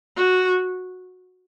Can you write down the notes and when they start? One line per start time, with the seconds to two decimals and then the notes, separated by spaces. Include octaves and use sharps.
0.16 F#4